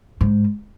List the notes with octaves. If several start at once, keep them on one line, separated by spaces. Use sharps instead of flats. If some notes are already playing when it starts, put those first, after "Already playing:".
G#2